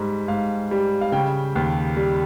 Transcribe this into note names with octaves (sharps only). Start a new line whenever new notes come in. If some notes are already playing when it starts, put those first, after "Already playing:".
Already playing: G#2 G3
G#2 F5
G3
F5
C#3 G5
D#2
G3